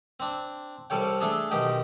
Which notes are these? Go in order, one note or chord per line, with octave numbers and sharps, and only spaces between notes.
C4 D4
C2 G3 A4 C#5 G5
A3 D4 G#4 A4
B1 D#3 D#4 G4 D#5 G5